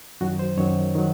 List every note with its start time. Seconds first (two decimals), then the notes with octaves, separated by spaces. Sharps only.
0.21 F#2 D#3 F#3 F#4
0.39 C5
0.57 F#2 D#3 F#3 C#5
0.95 D#3 F#3